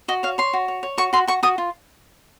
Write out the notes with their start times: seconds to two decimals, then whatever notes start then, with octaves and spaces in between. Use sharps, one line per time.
0.08 F#4 D#5
0.23 C#5 F5
0.38 C#5 C6
0.53 F#4
0.68 C#5
0.83 C#5
0.98 F#4 C#6
1.13 F#4 C6
1.27 F#4 C#6
1.43 F#4 D#6
1.58 F4